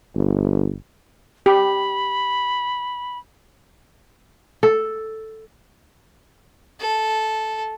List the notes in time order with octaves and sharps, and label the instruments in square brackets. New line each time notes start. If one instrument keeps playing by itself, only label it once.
[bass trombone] G1
[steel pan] G4 [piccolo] B5
[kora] A4
[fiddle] A4